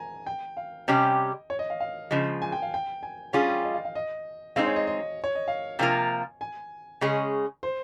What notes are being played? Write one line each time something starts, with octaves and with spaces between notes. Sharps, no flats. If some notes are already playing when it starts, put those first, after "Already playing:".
Already playing: G#5 A#5
G5
F5
C3 G3 C#4 G4 D#5
C#5
D#5
F5
F5
C#3 F3 G#3
G#5
G5
F5
G5
G#5
G3 C#4 F4 G#4 G#5
G5
D#5
F5
F5
D#5
G#3 C4 D#4 G#4 F5
C#5
D#5
D#5
C#5
D#5
F5
C3 F3 A#3 F4 A#4 G#5
G#5
C#3 G#3 C#4 G#4
C5